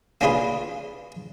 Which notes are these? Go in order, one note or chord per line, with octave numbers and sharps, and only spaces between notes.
A#3 C#4 D4 F4 G#4 B4